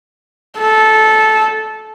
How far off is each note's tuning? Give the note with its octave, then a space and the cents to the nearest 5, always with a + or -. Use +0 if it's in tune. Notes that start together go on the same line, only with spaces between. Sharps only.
A4 -15